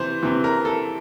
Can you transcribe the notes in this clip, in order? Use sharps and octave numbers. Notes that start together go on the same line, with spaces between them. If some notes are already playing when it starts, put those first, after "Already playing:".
Already playing: C3 E3 C5
C3 E3
A#4
A4